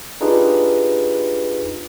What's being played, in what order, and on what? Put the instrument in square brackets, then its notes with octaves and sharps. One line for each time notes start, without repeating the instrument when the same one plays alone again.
[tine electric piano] D4 D#4 F4 G4 G#4 B4